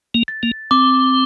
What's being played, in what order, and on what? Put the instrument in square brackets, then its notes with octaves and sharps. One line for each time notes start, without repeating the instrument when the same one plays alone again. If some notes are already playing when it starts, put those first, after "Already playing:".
[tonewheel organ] A#3
[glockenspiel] A6
[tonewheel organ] A#3
[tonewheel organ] C4 [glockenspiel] D6